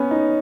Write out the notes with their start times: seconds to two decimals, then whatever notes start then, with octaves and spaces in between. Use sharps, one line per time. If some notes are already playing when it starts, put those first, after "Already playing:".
Already playing: B3 C#4
0.11 D#4